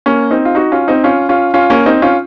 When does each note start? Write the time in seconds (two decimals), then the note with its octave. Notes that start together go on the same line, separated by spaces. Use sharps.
0.06 A#3 C#4
0.31 C4 D#4
0.45 F4
0.55 D#4 F#4
0.72 C#4 F4
0.88 C4 D#4
1.04 C#4 F4
1.29 C#4 F4
1.54 C#4 F4
1.70 A#3 C#4
1.86 C4 D#4
2.02 C#4 F4